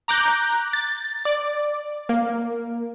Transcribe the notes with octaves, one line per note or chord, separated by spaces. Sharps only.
A#5 D6 F#6 G6 A#6
A6
D5
A#3